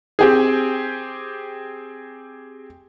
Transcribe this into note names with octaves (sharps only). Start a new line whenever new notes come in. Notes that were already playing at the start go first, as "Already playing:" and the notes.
C4 G4 G#4